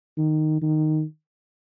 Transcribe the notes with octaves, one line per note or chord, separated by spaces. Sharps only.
D#3
D#3